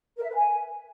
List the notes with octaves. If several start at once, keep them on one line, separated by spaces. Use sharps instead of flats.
A#4
E5
B4
G#5